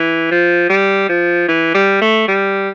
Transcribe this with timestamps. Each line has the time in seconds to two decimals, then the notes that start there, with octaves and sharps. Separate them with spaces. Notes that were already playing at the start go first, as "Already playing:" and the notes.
Already playing: E3
0.31 F3
0.69 G3
1.09 F3
1.48 E3
1.74 G3
2.02 A3
2.28 G3